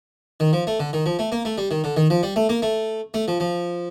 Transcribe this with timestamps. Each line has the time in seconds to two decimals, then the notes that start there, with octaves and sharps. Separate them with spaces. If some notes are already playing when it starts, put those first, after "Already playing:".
0.40 D#3
0.53 F3
0.67 A3
0.79 D3
0.93 D#3
1.06 F3
1.19 A3
1.32 A#3
1.45 A3
1.58 G3
1.71 D#3
1.84 D3
1.97 D#3
2.10 F3
2.23 G3
2.36 A3
2.49 A#3
2.62 A3
3.14 A3
3.28 F3
3.40 F3